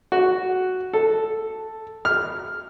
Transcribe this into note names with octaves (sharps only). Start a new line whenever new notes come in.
F#4
A4
F6